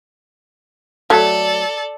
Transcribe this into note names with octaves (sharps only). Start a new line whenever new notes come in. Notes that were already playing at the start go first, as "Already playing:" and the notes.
F#3 A3 A4 D5